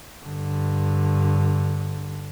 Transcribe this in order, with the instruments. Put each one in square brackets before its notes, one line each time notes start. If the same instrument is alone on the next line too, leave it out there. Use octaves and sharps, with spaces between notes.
[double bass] G2 D3